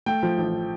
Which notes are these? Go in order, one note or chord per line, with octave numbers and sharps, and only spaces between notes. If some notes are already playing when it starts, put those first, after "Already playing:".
A3 G5
F3
A1